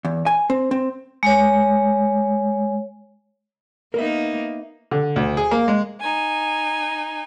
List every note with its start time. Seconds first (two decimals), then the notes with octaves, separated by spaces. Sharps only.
0.05 E2
0.26 G#5
0.50 C4
0.71 C4
1.23 G#3 C#5
3.94 A#3 B3 D#4 A#4 E5
4.91 D3
5.16 D2
5.37 G#4
5.51 A#3
5.68 G#3
6.01 D#4 G#5